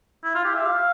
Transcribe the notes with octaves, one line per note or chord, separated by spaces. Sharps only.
E4
F4
G4
E5
F5